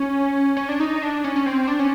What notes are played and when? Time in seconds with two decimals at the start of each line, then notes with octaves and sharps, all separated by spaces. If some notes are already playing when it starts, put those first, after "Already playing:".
Already playing: C#4
0.57 C#4
0.69 D4
0.80 D#4
1.02 D4
1.24 C#4
1.36 C#4
1.46 C4
1.68 D4
1.79 C#4